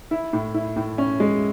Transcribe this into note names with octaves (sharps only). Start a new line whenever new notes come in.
E4
A2
E4
A2
C#4
G#3